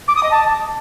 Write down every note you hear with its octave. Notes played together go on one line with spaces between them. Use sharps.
D6
D#6
D#5
A5